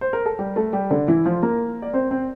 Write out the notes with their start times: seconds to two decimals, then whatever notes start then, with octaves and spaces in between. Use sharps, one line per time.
0.01 C5
0.13 A#4
0.26 A4
0.39 G3 G4
0.56 A3 A4
0.73 G3 G4
0.90 D3 D4
1.08 E3 E4
1.25 F3 F4
1.43 A#3 A#4
1.82 D5
1.93 C4 C5
2.11 C4 C5